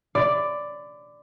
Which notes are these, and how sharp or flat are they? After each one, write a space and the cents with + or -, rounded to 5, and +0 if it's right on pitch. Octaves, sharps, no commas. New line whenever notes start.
D5 +0 B5 +35